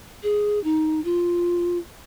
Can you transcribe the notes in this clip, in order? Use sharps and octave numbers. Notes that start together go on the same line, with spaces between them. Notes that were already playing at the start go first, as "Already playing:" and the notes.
G#4
D#4
F4